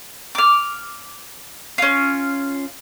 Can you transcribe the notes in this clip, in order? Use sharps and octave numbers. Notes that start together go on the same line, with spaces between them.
D6 F6
C#4 F4